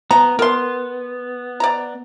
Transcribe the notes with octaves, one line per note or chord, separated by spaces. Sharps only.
B3 A#5
B3 A#4 C6
D5 A#5